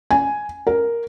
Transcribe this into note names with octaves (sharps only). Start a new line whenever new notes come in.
G#5
A#4